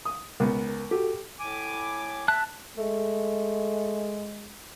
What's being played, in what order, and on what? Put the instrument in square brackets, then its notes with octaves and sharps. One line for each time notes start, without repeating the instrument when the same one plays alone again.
[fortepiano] D#6
[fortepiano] C#2 B3 [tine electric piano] A#4
[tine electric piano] F#4 A4 [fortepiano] G4
[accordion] A2 G#5 D6
[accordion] E5 [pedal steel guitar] A5 F#6
[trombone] G#3 [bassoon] A3